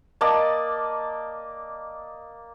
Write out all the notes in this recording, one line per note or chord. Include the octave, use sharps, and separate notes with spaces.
A#3 D5 D#5 A5